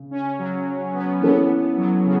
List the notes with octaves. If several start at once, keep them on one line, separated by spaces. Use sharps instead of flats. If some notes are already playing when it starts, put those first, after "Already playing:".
Already playing: C#3
C#4
F#3
B3
E3 B3 C#4 A4 C#5
F#3
C#3